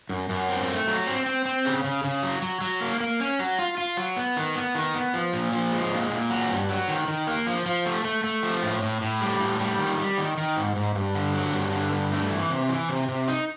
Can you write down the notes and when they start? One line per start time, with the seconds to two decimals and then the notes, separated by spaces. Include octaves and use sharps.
0.09 F#2
0.29 F#2
0.49 C4
0.68 A3
0.87 F#3
1.07 C4
1.26 C4
1.45 C4
1.65 C#3
1.84 C#3
2.04 C#3
2.23 F#3
2.42 F#3
2.61 F#3
2.81 A#3
3.00 A#3
3.20 C#4
3.39 F#3
3.59 F4
3.78 F4
3.97 F#3
4.17 B3
4.37 D#3
4.55 B3
4.75 D#3
4.94 B3
5.14 F3
5.33 A#2
5.52 F3
5.72 G#3
5.91 A#2
6.10 A#2
6.30 F#3
6.49 G2
6.69 F#3
6.88 D#3
7.08 D#3
7.27 A#3
7.47 F3
7.66 F3
7.85 A3
8.05 A3
8.24 A3
8.43 F3
8.63 A2
8.82 A2
9.01 A2
9.21 G3
9.40 A2
9.59 G3
9.79 D#3
9.98 G3
10.18 D#3
10.37 D#3
10.56 G#2
10.76 G#2
10.95 G2
11.15 D3
11.34 F#3
11.54 G2
11.72 D3
11.92 G2
12.12 A3
12.31 E3
12.50 C3
12.69 E3
12.89 C3
13.09 C3
13.28 D#4